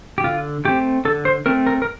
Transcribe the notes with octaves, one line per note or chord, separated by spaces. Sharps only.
G4
D3 F4
A3 C4 G4
D3 A4
C5
A3 C4 A#4
A#4
A#4